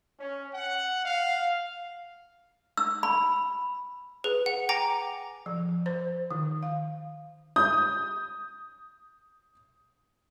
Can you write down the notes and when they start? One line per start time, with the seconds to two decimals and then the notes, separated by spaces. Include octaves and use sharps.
0.18 C#4
0.53 F#5
1.05 F5
2.77 E6
3.03 B5
4.24 G#4 B4
4.46 F#5
4.69 G5 G#5 A#5 D6 A#6 C#7
5.46 F3
5.86 C5
6.31 D#3
6.63 F5
7.56 D#6 G6